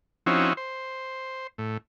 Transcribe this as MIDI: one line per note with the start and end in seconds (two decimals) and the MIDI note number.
0.26 0.53 53
0.26 0.53 60
0.26 0.53 61
0.26 0.53 63
0.26 0.53 64
0.26 0.53 66
0.57 1.47 72
1.58 1.77 45